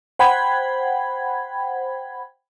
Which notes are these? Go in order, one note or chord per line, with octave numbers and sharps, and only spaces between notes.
C5 F#5 G5 B5 G#6